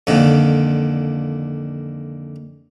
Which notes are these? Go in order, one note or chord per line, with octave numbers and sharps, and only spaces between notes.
F2 A#2 D3 D#3